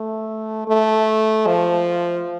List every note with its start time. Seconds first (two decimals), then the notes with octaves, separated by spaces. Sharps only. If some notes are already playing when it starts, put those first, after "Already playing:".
Already playing: A3
0.68 A3
1.47 F3